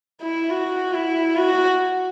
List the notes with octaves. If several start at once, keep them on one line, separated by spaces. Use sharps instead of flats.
E4
F#4
E4
F#4